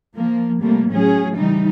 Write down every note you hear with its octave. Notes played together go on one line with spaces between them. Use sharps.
F3 A#3
C3 G3 A3 A#3
A2 F#3 C#4 G#4
C#3 E3 G3 D#4